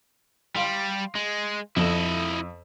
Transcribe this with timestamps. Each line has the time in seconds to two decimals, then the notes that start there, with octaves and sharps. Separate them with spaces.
0.56 G3 F5 C6 F7
1.15 G#3
1.76 F2 E4 A4 D#5 E7